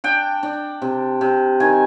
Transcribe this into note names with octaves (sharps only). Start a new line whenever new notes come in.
D4 G5
D4
C3
C3
D#3 G#5